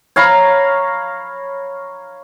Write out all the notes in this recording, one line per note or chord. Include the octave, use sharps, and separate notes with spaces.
C#5 F5 A#5 B5